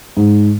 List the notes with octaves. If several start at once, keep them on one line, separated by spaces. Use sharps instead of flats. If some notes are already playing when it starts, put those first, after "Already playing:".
G#2